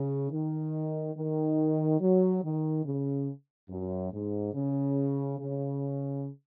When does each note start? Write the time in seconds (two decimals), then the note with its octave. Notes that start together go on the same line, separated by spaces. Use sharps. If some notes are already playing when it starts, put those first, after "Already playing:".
Already playing: C#3
0.31 D#3
1.15 D#3
2.00 F#3
2.42 D#3
2.85 C#3
3.69 F#2
4.12 G#2
4.54 C#3
5.38 C#3